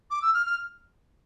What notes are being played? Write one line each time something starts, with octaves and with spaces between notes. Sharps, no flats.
D6
E6
F6
F6